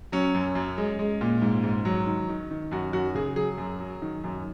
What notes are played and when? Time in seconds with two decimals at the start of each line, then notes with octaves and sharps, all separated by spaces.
0.12 F#3 C#4
0.34 F#2
0.55 F#2
0.78 G#3
0.99 G#3
1.21 A#2
1.42 G#2
1.64 G#2
1.85 F#3
2.07 D#3
2.29 D#3
2.51 D#3
2.71 F#2 F#4
2.93 F#2 F#4
3.15 C#3 G#4
3.36 F#3 G#4
3.58 F#2
3.80 F#3
4.02 D#3
4.24 F#2